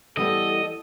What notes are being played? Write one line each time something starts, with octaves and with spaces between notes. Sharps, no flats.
E3 G3 B3 A4 D#5